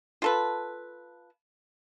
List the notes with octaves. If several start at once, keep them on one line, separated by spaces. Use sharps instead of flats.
F4 A4 B4